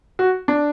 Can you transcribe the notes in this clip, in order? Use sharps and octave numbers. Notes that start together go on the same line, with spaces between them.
F#4
D4